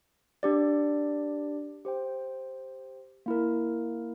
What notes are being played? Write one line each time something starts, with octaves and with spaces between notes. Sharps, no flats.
D4 G4 D5
G4 C5 G5
A#3 E4 A#4